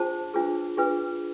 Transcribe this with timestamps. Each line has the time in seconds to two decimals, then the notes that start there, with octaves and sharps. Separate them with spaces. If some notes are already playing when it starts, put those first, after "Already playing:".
Already playing: D4 F4 G#4 C5 A5
0.34 D4 F4 G#4 B4
0.77 D4 F4 G#4 B4